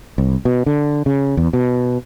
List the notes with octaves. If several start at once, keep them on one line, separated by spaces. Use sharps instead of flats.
C2
B2
D3
C#3
E2
B2